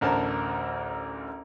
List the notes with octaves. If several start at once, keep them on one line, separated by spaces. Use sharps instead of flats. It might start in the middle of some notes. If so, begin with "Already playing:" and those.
A1 D2 A#4 C5 A5